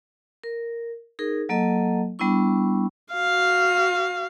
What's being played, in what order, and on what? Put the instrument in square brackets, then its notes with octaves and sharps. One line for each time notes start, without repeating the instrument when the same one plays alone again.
[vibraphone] A#4
D#4 G#4 A#4
F#3 A#3 A4 D#5 A5
G3 B3 D4 E4 C#6
[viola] F#4 F5